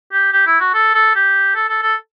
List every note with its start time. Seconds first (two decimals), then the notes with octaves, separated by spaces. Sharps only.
0.13 G4
0.33 G4
0.47 E4
0.61 F#4
0.74 A4
0.94 A4
1.15 G4
1.55 A4
1.69 A4
1.82 A4